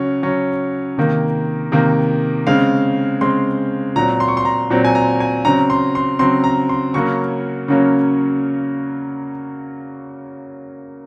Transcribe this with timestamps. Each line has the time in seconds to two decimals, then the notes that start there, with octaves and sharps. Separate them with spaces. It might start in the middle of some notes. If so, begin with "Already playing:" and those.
Already playing: C#3 F#3 C#4
0.22 C#3 F#3 C#4
0.98 C3 D#3 A#3
1.72 C3 D#3 A#3
2.47 C#3 G#3 C4 F5
3.21 C#3 G#3 C4 C6
3.96 A#2 F#3 C4 A#5
4.20 C6
4.28 C#6
4.37 C6
4.45 A#5
4.70 A#2 F#3 C4
4.85 G#5
4.95 A#5
5.20 G#5
5.45 C#3 F#3 C4 A#5
5.70 C6
5.95 C6
6.19 C#3 F#3 C4 C6
6.44 A#5
6.69 C6
6.94 C#3 F#3 A#3 C#4 C#6
7.68 C#3 F#3 A#3 C#4